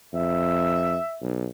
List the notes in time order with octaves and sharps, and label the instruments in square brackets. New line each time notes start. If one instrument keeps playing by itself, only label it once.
[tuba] F2 [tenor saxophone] E5
[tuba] B1